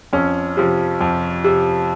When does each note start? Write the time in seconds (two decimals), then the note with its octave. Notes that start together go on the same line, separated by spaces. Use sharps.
0.13 F2 C#4
0.57 C3 F3
1.01 F2
1.44 C3